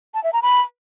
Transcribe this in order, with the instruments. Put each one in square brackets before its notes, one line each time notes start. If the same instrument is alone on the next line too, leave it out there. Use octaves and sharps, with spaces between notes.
[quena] A5
E5
A#5
B5